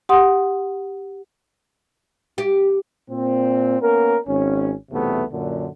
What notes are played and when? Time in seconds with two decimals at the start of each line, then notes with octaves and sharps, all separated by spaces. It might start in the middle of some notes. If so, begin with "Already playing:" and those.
0.09 G4 F#5 C6 D#6
2.38 G4
3.10 A#2 C4
3.80 A#3 B3 C#4 A#4
4.27 G#1 C#4
4.91 B1 E2 C3 A3 B3
5.31 F#2 A#2 D3